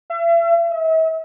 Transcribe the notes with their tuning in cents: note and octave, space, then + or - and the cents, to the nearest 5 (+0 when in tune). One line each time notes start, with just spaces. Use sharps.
E5 +40
E5 -40